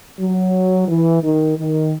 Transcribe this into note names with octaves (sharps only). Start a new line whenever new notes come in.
F#3
E3
D#3
D#3